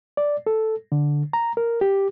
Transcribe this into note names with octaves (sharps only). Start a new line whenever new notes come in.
D5
A4
D3
A#5
A#4
G4